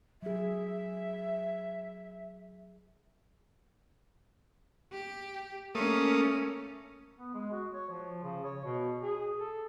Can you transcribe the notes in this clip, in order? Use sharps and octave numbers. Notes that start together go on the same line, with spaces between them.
F#3 G#4 E5
G4
A3 A#3 C#4 D#6
B3
G#3
F#4
C#5
F3
C#3
C#5
B2
G#4
A4